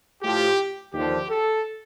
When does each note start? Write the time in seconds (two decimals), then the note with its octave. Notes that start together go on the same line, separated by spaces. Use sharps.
0.22 A2 F3 G4
0.94 D#2 D3 F3 G4
1.29 A4